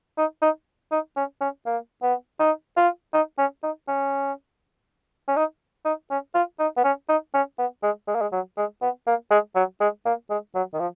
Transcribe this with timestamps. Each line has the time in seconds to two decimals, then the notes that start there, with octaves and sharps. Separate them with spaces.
0.18 D#4
0.42 D#4
0.92 D#4
1.16 C#4
1.41 C#4
1.66 A#3
2.03 B3
2.40 D#4
2.77 F4
3.14 D#4
3.38 C#4
3.63 D#4
3.88 C#4
5.28 C#4
5.37 D#4
5.85 D#4
6.11 C#4
6.35 F4
6.59 D#4
6.77 B3
6.84 C#4
7.09 D#4
7.34 C#4
7.58 B3
7.83 G#3
8.08 G#3
8.15 A#3
8.22 G#3
8.32 F#3
8.57 G#3
8.82 B3
9.07 A#3
9.31 G#3
9.56 F#3
9.81 G#3
10.06 A#3
10.30 G#3
10.55 F#3
10.74 D#3
10.80 F3